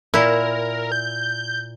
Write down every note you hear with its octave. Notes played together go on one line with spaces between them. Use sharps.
A#2 E4 A#4
G6